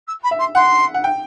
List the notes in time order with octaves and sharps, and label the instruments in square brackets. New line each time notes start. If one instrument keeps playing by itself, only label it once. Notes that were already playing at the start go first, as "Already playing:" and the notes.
[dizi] E6
B5
[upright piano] E5
[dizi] C6
[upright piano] F#5 [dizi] C6
[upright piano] F#5
G5